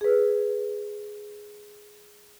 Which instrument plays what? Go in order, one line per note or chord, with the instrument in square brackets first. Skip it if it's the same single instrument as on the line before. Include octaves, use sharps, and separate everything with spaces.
[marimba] G#4 B4